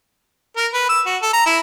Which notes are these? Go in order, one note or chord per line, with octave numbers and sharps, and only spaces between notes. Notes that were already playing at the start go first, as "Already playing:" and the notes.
A#4
B4
E6
F#4
A4
A#5
E4